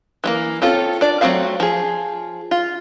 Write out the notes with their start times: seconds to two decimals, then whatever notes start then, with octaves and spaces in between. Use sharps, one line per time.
0.24 E3 A3 A#3
0.62 C4 C#4 F4 A4
1.01 D4 D5
1.21 F#3 A3 C4 F#4 F5
1.60 F3 G#4
2.51 F4